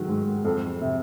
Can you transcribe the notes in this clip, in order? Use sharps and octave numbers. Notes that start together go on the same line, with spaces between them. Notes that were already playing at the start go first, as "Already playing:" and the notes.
Already playing: D#3 F#3
G#2
F2
C3